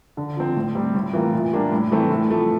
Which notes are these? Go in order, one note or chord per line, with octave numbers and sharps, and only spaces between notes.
D3
F3 C4
A2
G3 C4
A2
E3 A#3 F4
A#2
G3 A#3 D4
A2
E3 A3 C4 E4
A2
F3 A3